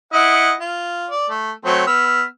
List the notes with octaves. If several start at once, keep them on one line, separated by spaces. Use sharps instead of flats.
E4 D#5 F#5
F4
D5
A3
F#3 A3 C4
B3 E6 F6